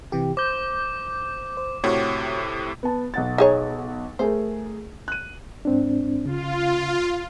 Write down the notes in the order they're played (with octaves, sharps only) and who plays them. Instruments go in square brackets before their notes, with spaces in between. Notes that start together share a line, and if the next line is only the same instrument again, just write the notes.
[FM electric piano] C3 E3 G4
[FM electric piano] C5 G6 [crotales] D6
[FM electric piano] C5
[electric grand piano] A2 C3 [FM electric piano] F#4 G4 C#5
[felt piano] B3 A5
B1 F#5 A6
[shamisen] D#4 G#4 C#5
[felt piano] A3 G#4 A#4 [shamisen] C5
[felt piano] F#6 D#7
[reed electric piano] G#2 C4 D4
[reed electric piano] C#3 [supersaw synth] F4